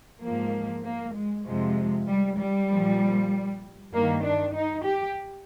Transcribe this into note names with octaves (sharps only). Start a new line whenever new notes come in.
G#2 F3 A#3
A#3
G#3
F2 C3 F3 G#3
G3
G3
A#2 F3
G2 D#3 A#3
D4
D#4
G4